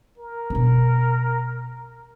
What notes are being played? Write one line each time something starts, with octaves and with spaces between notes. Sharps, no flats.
A#4
B2 D4